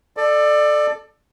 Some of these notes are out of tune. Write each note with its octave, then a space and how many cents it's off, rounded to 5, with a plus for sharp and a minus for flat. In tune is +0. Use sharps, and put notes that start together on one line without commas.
A4 +0 D5 +25